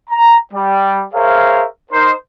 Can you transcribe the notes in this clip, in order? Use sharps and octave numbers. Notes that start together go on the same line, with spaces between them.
A#5
G3
G#4 A#4 C5 C#5 E5 F5
D#4 A#4 C5